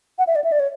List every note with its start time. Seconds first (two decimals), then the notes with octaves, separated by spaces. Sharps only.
0.19 F#5
0.27 E5
0.36 D5
0.44 E5
0.52 D5
0.60 C#5